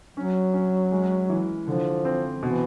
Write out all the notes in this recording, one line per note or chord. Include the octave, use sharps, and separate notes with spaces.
F#3 C#4
C#4
G#3
E3
D3 F3
C4
B2 E3